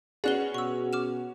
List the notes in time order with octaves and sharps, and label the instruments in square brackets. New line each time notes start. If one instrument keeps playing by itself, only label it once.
[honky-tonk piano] B3 C#4 F#4 [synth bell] G#4 [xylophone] D5 F#6 G7
[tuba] B2 [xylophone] C#6 E6
[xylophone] D6 F6 E7